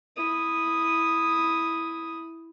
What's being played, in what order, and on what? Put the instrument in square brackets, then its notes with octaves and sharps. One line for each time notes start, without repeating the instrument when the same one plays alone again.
[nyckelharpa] E4 D#6